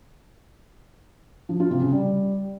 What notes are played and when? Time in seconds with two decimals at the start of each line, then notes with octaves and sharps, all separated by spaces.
1.49 F3
1.60 F4
1.71 C3
1.82 C#3
1.92 G3